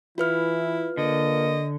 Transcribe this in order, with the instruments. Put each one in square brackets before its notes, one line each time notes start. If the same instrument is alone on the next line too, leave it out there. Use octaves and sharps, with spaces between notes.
[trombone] E3 [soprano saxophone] E4 [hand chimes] F4 B4 F6
[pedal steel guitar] D3 [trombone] A#3 [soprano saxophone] D#5